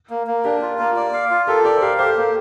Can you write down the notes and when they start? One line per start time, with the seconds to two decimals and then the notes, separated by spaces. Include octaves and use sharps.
0.10 A#3
0.27 A#3
0.44 D4 G4 A#4
0.62 F4
0.79 A#3
0.96 D5
1.14 F5
1.31 F4
1.47 G4 A4 A#4
1.65 G4 A#4 D5
1.77 C5
1.82 G4 A#4 F5
1.99 G4 A4 C5
2.17 A#3